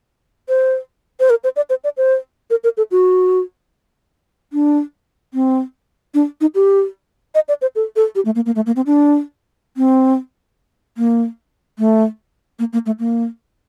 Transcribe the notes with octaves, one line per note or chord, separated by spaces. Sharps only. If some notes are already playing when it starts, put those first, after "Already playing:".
C5
C5
A#4
C5
D5
C5
D5
C5
A#4
A#4
A4
F#4
D4
C4
D4
D#4
G4
D#5
D5
C5
A4
A4
G4
A3
A#3
A#3
A3
A#3
C4
D4
C4
A#3
A3
A#3
A#3
A3
A#3